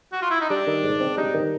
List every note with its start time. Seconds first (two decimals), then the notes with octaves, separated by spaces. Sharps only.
0.12 F#4
0.22 F4
0.31 E4
0.41 D#4
0.50 G3 D4
0.67 D#3
0.84 G#2
1.01 C4
1.17 G3 D#4
1.34 D#3